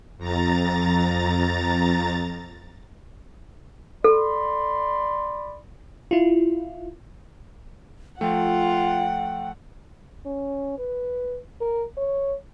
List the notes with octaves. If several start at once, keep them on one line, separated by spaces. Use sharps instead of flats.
F2 A#5 A6
A4 D5 B5 C6
E4 F4
F3 A3 F4 F#5 G5
C#4
B4
A#4
C#5